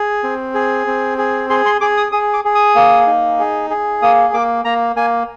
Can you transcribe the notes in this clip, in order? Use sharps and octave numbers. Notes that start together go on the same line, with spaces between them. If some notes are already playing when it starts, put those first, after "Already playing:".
Already playing: G#4
C4
G#4
C4
G#4
G#4 C6
C6
G#4 D6
D#6
G#4 D#6
D6
G#4
D#6
A#3
D#4
G#4
G#4
A#3 D#6
A#3 D6
A#3 A#5
A#3 G#5